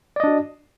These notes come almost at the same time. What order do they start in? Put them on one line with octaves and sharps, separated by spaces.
D5 D#5 D4 F#4